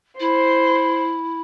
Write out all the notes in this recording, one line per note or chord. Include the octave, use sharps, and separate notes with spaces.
E4 C5